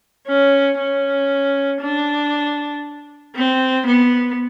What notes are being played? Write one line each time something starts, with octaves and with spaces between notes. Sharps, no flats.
C#4
C#4
D4
C4
B3